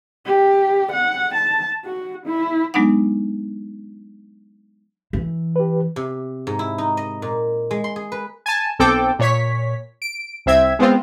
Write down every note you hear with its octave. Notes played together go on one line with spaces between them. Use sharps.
G4
F#5
A5
F#4
E4
F#3 G#3 B3 D4 D#4 F#5
E3
G4 B4
C3
G#2
E4
D#4
D#5
A#2
G#3
C6
G#4
B4
G#5 A5
B1 C4 A4 G5 D6
A#2 C#5 B6
D7
C2 C4 E5 G#6
G#3 B3 C4 F4